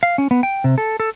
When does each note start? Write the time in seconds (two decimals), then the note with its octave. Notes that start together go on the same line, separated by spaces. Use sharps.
0.03 F5
0.18 C#4
0.31 B3
0.43 G5
0.64 C3
0.78 A4
1.00 A4